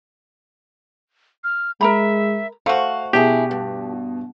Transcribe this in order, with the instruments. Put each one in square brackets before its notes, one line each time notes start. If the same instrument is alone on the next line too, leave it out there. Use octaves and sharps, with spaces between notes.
[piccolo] F6
[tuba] G#3 [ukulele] A#4 A#5 B5 [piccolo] E5
[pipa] A3 F#4 [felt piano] C5 F5
[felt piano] B2 [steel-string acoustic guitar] D4 E4 G#4 [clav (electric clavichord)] G4
[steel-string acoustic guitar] G2